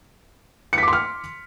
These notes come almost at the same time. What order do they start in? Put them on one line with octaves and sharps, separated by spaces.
C#7 B6 D6 C6 F6